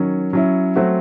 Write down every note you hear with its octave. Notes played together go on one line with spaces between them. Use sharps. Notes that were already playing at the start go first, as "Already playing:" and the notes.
Already playing: D#3 F#3 C#4
F#3 C#4 E4
F#3 A3 C4 F#4